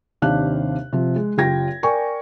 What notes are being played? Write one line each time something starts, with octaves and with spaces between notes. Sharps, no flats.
D#2 C3 D4 G4 F5 F#6
C3 F3
G#3
F#1 F4 G4 G5 G#6 A#6
A#4 D5 G5 G#5 C#6